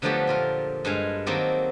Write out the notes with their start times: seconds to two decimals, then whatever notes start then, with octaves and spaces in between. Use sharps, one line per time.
0.02 D3 F3 F#3 A3 B3 G4
0.27 A#2 F4 A#4
0.85 G2 G#3 F5 G#5
1.26 D#3 F#3 A#3 C4 G4 A4